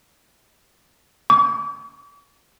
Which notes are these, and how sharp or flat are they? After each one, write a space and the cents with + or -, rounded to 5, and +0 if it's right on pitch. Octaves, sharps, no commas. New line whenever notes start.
D6 -45